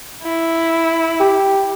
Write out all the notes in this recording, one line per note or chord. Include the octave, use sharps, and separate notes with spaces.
E4
G4